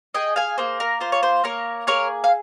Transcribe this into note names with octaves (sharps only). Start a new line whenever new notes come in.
G#4 D#5 G5
F5 G#5
A#3 C5
A#4
F4 C5
C#5
C5
A#3 A#4 C#5
G#4 A#4 C#5
F5